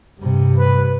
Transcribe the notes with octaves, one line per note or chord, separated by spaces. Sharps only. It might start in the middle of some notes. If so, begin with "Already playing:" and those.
G2 C3
B4